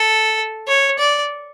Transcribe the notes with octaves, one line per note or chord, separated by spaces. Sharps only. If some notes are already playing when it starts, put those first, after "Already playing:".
Already playing: A4
C#5
D5